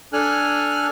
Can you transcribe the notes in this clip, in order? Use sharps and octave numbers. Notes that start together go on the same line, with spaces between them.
D4 A4 G#5 F6 F#6